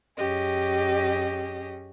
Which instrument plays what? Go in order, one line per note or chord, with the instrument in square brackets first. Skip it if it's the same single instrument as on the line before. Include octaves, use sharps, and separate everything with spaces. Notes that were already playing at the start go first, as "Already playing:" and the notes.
[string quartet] F#2 C#4 G4 G#4 D#5